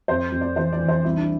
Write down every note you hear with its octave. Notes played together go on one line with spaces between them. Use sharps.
F2 C5
F2
D5
E3 C5
D5
E3
C5
C2 E4
D4